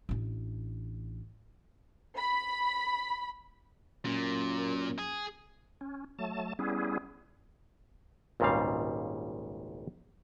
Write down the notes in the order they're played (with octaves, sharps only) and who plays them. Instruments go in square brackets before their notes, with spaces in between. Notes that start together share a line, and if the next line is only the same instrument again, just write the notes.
[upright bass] A1 D4
[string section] B5
[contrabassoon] F#2 [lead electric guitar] A#2
[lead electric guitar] G#4
[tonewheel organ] C#4
F#3 A3 A5
G3 B3 C#4 E4 G#4
[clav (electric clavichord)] G#1 C#2 A#2 C#3 G3 F5